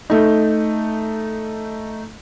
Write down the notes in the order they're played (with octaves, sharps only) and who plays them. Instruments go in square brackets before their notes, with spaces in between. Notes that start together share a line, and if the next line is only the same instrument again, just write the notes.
[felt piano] A3 D#4